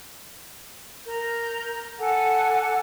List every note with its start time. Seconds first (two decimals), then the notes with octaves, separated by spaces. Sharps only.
1.04 A#4 G6
2.00 A4 F#5 G#5 D6